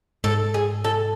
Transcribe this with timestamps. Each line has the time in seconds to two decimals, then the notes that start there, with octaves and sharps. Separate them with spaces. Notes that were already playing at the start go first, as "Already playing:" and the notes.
0.24 G#2 A4
0.54 G#4
0.84 A4